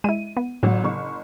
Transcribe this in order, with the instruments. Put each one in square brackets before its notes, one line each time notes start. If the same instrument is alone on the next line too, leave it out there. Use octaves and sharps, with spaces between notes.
[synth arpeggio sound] G#3 E4 [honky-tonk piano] D#7
[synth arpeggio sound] B3
[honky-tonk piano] G1 F#3 [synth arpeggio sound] A2
[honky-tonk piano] F#1 C#6